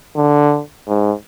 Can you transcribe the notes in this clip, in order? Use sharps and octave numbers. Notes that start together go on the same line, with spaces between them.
D3
G#2